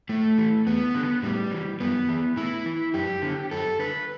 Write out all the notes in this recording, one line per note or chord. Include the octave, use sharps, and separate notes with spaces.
A2 A3
E3
E2 B3
D3
A2 G3
E3
F#2 B3
E3
A2 E4
E3
F#2 G4
D3
F#2 A4
D3 B4